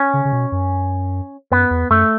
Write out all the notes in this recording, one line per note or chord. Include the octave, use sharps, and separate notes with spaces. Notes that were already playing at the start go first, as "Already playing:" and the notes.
Already playing: C#4
C#3
C#3
B2
F#2
F#2 B3
E2
F#2 A3